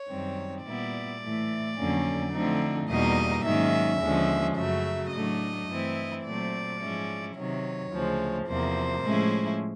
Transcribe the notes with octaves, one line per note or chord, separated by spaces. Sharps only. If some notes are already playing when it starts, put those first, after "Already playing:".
Already playing: C#5
F#2 D#3 G3 C4
A#2 G3 B3 E4 D5
A2 E3 A3
F2 D3 F#3 A#3 C#4
D3 F3 A3 C4 D#4
E2 B2 G3 A#3 D#4 D#5
G#2 D#3 F#3 A#3 C#4 E5
D#2 D3 F3 G#3 C#4
F#2 C#3 F#3 A3 E5
A2 F#3 A3 D4 D#5
G2 E3 A3 C4 E4
A#2 F#3 A3 C4 D5
G#2 F3 G#3 C#4 E4
C3 D#3 F#3 C#5
D2 C#3 F3 G#3
E2 C3 F3 A#3 C5
A2 F3 G#3 C#4 E4